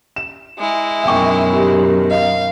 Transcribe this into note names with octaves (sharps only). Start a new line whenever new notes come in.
E7
G#3 E4
F#2 B2 D#3 E5 G5 C#6
G4
D#5 F5